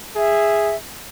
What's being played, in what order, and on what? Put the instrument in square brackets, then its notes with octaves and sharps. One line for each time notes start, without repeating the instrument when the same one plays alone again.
[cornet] G#4 [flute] E5